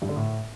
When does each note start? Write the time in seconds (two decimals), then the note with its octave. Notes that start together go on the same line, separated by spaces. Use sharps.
0.02 G2
0.09 D3
0.16 A2